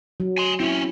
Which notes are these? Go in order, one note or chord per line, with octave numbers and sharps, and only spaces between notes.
F#3
G#5 C6
C4 C#4 E4